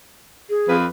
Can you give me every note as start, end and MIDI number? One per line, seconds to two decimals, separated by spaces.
0.50 0.76 68
0.67 0.85 41
0.67 0.85 71